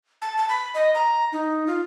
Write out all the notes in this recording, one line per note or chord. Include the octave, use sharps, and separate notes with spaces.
A5
A5
B5
D#5
A#5
D#4
F4